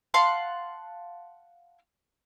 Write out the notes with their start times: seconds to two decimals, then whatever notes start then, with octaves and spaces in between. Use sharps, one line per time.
0.14 F5 F#5 A5 C6